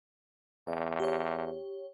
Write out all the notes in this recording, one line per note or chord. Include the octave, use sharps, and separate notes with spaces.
E2 D5
G4 C#5